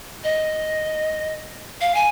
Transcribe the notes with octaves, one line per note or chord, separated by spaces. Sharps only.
D#5
F5
G#5